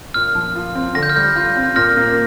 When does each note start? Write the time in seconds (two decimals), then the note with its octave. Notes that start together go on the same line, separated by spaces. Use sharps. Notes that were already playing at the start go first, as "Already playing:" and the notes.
0.14 A#2 F6
0.35 F3
0.55 F4
0.75 C4
0.95 D3 A#6
1.03 G6
1.10 F6
1.16 G3 G6
1.36 F4
1.56 C4
1.76 A#2 F6 A#6
1.97 A#3